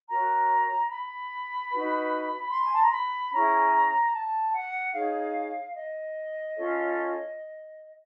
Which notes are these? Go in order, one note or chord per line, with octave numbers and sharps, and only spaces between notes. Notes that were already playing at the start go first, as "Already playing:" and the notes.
F#4 A#4 C#5 A#5
B5
D#4 F#4 B4
C6
G#5
A5
A#5
B5
C#4 E4 G#4 A#5
A5
F#5
D#4 G#4 C#5 F5
D#5
C#4 F4 A4 C#5